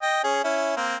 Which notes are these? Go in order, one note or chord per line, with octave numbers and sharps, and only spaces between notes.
D#5 G5
C#4 G#4
C#4 E4
A#3 C4